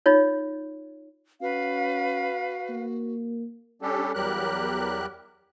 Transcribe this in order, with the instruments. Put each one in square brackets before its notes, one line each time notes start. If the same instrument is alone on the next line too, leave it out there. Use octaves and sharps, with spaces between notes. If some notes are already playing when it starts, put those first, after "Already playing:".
[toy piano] D#4 F4 C#5
[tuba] C#4 [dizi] F#4 [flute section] B4 F5
[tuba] A#3
[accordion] G3 C#4 D4 G4 A4
E2 F#3 G3 G4 A#4 F#6